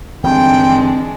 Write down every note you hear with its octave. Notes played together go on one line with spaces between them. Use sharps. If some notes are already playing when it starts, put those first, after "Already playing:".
G1 D#3 E3 G#3 C4 D4 G5